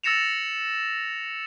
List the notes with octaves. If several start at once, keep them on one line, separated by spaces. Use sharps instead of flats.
E6 A6 A#6 C#7 E7 F7